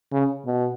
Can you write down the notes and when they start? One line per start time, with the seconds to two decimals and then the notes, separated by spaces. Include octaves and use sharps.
0.13 C#3
0.46 B2